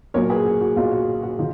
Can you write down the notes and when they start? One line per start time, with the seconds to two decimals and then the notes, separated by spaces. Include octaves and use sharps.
0.14 B1 A#2 F#3 A#4 C#5
0.30 G#4 B4
0.45 F#4
0.61 F#4
0.76 B1 A#2 F#3 F4
0.92 F#4
1.22 F#4
1.38 D#3 F4